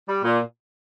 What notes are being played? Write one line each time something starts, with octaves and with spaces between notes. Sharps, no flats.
G3
A#2